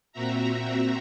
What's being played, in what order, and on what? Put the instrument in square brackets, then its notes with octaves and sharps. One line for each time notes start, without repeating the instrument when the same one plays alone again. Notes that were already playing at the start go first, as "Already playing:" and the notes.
[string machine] A#2 C4 F#4 E5 A#5